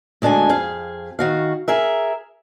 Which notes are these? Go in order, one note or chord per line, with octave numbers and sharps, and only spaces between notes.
D2 G#3 D4 A4 G#5
F2 G#4 F5
D#3 F#4 F5
G#4 A#4 E5